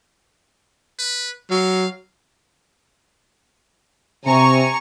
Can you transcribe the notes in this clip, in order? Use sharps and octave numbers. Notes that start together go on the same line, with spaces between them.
B4
F#3 F5
C3 G#5 A#5 C#6